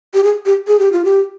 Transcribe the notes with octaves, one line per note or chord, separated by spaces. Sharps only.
G4
G#4
G4
G#4
G4
F4
G4